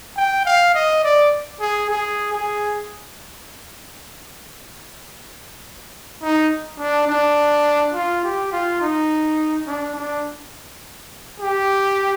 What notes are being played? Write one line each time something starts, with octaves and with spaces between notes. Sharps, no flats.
G5
F5
D#5
D5
G#4
G#4
G#4
D#4
D4
D4
F4
G4
F4
D#4
D4
D4
G4